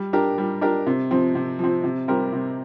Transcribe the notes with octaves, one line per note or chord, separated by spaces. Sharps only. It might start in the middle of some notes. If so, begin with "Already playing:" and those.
Already playing: G3
D4 G4 A#4
G3
D4 G4 A#4
C3
F3 C4
C3
F3 C4
C3
G3 C4 G4 A#4
C3